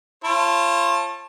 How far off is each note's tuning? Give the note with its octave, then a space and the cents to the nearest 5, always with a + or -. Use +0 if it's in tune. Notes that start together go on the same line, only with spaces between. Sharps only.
F4 -30 C#5 -40 A5 +0